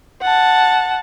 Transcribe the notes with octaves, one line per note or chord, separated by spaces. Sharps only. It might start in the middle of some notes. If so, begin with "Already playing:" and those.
F#5 A5